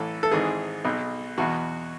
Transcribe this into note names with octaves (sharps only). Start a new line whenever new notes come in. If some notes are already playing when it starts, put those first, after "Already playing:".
Already playing: A1 A2 E3 A4
A4
G#1 G#2 E3 G#4
B1 B2
E2 B2 F#4